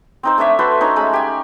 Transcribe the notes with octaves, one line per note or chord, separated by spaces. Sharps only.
C4 D#4 C5
A3 D4 C#5 E5
F#4 A4 B4 C5
C#4 D#4 C5 C#5
G#3 A3 C#4 B5
G4 G#5